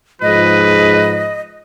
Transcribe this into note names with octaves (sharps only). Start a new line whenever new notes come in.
G#2 F3 B4 D#5